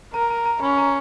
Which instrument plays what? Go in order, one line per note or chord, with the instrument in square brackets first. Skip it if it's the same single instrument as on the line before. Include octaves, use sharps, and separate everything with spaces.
[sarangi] A#4 [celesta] A#5
[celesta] A#5
A#5
[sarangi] C#4 [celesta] B5
[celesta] A#5